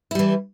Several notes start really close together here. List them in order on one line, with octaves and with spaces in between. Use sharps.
E4 G3 E3